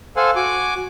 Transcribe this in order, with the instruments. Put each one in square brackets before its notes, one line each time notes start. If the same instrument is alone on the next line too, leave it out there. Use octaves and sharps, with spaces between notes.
[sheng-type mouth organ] A4 C5 F5 F#5 G#5
F#4 G#5 D6